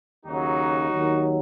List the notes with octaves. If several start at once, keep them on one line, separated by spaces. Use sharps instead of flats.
D#2 C#3 F#3 D#4 F#4
D#2 D#3 F#3